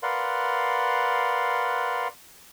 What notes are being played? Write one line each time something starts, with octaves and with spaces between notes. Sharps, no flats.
A#4 B4 D5 F5 F#5 C6